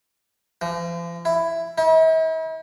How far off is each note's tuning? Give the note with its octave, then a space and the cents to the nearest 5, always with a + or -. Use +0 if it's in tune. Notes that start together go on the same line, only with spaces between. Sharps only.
F3 -40
E4 +10
E4 -45